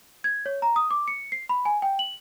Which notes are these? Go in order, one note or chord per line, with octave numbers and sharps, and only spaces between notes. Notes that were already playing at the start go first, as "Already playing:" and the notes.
G#6
C#5
A#5
D#6
D6
C#7
C7
B5
G#5
G5
F#7